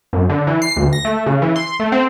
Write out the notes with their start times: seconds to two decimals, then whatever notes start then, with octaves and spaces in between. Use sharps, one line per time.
0.13 F#2
0.29 D3
0.47 E3
0.62 C7
0.76 D2
0.93 A#6
1.05 A3
1.26 C#3
1.42 E3
1.56 C6
1.80 A3
1.92 C4